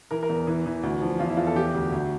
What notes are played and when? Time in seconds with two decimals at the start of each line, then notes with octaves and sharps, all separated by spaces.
0.11 E3 A#4
0.23 A#4
0.29 E2
0.47 E3
0.66 E3
0.83 D2
1.01 F3
1.19 E2 F4
1.29 E4
1.37 E2 F4
1.47 A4
1.56 E3 G4
1.74 D2
1.92 D2